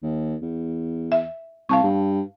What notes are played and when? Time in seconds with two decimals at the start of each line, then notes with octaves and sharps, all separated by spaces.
0.03 D#2
0.42 E2
1.12 E5
1.69 C2 F5 A5 C#6
1.83 G2